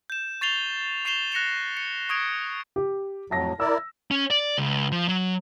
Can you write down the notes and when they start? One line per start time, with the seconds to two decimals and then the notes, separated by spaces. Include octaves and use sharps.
0.10 G6 E7
0.41 C#6 A6 C7 F7 G7
1.05 C#6 C7 E7 F7 G7
1.32 F#6 A#6 C#7 E7 F7
1.77 C#7
2.09 C#6 D#6 G#6 D7
2.76 G4
3.31 F2 A2 F#3 A5 A#6
3.60 E4 A#4 D5 E6
4.11 C#4
4.31 D5
4.58 C#2
4.92 F3
5.09 F#3